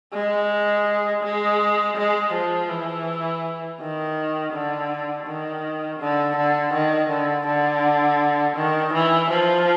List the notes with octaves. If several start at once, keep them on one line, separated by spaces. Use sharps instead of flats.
G#3
G#3
G#3
F3
E3
D#3
D3
D#3
D3
D3
D#3
D3
D3
D#3
E3
F3